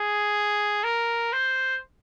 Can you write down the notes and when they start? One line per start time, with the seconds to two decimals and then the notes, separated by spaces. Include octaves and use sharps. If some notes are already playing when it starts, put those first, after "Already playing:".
Already playing: G#4
0.84 A#4
1.33 C5